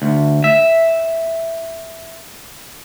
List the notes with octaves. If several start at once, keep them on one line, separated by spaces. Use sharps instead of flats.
D2
E5